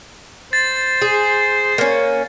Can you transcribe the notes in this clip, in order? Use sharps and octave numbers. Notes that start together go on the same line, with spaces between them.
C5 A6
G#4
A#3 C#4